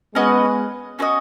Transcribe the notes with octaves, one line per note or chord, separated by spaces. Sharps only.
G#3 B3 C#4 F#4 B4 D#5
C#4 F#4 B4 D#5